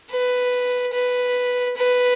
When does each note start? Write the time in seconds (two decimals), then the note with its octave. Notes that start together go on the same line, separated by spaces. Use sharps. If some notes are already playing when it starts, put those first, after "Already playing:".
0.11 B4
0.93 B4
1.76 B4